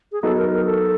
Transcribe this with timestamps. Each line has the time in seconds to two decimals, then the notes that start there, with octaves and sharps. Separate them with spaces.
0.12 G#4
0.22 F#3 B3 D#4 F#4 A4
0.37 A#4
0.51 A#4
0.65 A4